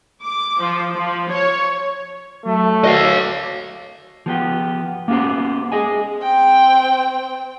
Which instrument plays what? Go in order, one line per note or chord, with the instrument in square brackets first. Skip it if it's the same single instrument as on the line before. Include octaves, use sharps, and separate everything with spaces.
[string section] D6
F3
F3
C#5
[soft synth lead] F#3 [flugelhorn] A3
[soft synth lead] F#4 [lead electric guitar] D#5 F5
[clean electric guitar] F3 B3 G4
A#3 B3 C#4 G4 C5
G#4 D#5 G#5
[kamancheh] C4 G5